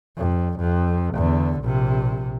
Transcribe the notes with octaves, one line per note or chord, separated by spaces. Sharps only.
F2
F2
E2 D3
A#1 C3